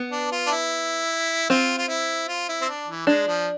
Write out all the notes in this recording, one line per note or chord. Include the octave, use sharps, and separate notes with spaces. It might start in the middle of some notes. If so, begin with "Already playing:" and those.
Already playing: B3
D4
F4
D4
E4
C4 F4
F4
E4
F4
E4
C4
D4
E3
G#3 D4
F3